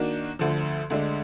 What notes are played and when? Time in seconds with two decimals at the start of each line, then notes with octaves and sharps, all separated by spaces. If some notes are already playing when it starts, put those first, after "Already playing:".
Already playing: D#3 A#3 D4 F#4
0.39 D2 D3 F3
0.90 D2 D3 G#3 D4